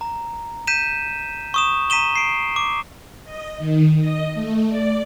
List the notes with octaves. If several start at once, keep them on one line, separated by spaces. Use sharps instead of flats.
A#5
G6 B6 D#7 E7
C#6 D#6 E7
A#5 B6 D#7 E7 G7
C7 D7
D6
D#5
D#3
D#5
A3
D5